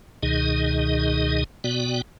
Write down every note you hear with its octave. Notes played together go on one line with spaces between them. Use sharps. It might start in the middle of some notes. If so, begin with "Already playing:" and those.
C#2 B2 D#3 D#4 G#4 D#5
B2 B3 F#4 D5 G5